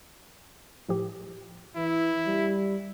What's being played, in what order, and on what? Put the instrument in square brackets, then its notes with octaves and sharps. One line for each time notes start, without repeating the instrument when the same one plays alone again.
[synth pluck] A2 F3 G4
[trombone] E3 [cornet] E4
[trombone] G3